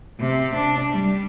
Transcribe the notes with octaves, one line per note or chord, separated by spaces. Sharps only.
C3
D4
G3